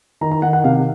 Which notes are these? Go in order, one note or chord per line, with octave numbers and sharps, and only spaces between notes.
D#3 A#5
A#5
D#3 F#5
F#5
C3 F5